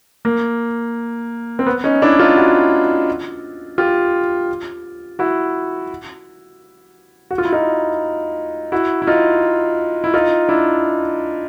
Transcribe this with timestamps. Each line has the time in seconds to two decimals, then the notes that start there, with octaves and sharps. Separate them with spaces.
0.25 A#3
1.59 C4
1.66 B3
1.84 C#4 D#4
2.02 D4 E4
2.19 D#4 F4
2.37 E4 F#4
3.78 F4 G4
5.19 E4 F#4
7.31 F#4
7.38 F4
7.45 E4
7.52 D#4 F4
8.72 E4 F#4
9.02 E4
9.07 D#4 F4
10.04 E4
10.14 D#4 F4
10.49 D4 E4